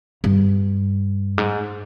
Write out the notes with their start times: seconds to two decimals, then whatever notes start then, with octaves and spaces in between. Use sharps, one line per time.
0.24 G2
1.38 G#2